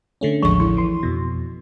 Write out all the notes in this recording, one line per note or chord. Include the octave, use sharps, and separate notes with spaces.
D3 A3 C#4
A1 D#2 F3 G#3 C#6
E4
E3 C6
F2 B2